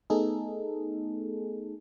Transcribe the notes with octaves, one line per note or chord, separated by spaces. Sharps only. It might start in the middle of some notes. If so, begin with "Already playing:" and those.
A3 B3 D#4 G#4 A4